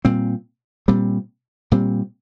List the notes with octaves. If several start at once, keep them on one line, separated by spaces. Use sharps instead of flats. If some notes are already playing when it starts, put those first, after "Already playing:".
A#2 G3 C4
A#2 G3 C4
A#2 G3 C4